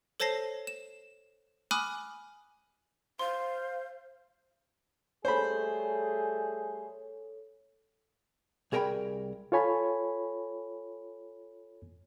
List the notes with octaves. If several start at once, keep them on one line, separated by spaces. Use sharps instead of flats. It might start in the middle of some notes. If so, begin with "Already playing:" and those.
A4 C5 C#5 A5 A#6 C7
E7
G#5 B5 D6 D#6 F6 F#6
C5 F5 C6
G3 A3 G#4 A4 C5 C#5 B5
C2 G#4 A#4 D#5 G5 B5
F4 A4 C#5 G#5 B5